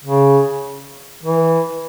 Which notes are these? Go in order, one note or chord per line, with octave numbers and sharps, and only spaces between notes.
C#3
E3